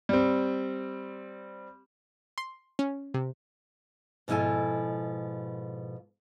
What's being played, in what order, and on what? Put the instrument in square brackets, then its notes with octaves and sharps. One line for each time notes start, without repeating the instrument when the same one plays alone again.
[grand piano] G3 C4
[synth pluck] C6
C#4
C3
[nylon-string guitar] G#2 B2 F3 E4 A4 G#5